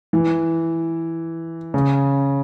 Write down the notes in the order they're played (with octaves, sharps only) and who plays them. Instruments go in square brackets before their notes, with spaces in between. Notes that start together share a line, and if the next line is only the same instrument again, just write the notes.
[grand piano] E3
C#3